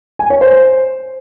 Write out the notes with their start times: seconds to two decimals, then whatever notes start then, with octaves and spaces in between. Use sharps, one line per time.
0.19 G#5
0.30 C#5
0.41 C5